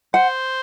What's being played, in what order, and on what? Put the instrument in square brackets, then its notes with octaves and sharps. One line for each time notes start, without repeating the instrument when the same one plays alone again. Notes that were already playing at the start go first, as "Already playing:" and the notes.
[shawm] C5 [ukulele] F#5